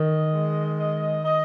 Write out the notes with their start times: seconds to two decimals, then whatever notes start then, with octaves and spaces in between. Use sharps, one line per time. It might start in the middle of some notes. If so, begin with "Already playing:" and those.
Already playing: D#3 D#5
0.32 G#3
0.78 D#5
1.25 D#5